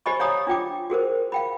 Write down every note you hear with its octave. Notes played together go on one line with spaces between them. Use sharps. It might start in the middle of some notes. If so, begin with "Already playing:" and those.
G4 C5 D#5 G#5 B5 C#6
C#5 D5 F5 G#5 A#5 D#6
D4 F4 G5 D6
F#4 G#4 A#4 C5
F5 G5 B5